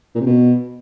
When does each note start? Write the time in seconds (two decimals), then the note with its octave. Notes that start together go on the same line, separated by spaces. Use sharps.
0.15 A#2
0.21 C3
0.26 B2